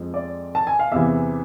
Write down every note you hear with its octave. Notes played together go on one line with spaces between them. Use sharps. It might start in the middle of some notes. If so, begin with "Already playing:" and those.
Already playing: F2 F3 G#3
D5
A5
G#5
F5
E2 C3 E3 E5